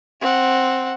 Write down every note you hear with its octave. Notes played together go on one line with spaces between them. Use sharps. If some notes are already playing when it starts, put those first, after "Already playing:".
C4 F#5